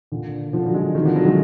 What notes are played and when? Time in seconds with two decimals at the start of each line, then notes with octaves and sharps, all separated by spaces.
0.12 A#2 D3
0.53 D3 F3
0.66 F#3
0.74 F3 G#3
0.95 D#3 F#3
1.05 D3 F3
1.16 D#3 F#3
1.26 F3 G#3